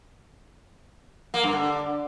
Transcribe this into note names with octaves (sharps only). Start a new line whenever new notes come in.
A#3
G2
D3